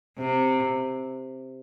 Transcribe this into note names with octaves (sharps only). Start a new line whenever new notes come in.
C3